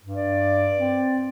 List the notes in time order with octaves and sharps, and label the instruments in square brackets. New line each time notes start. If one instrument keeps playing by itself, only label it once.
[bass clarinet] G2
[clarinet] D5
[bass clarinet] C4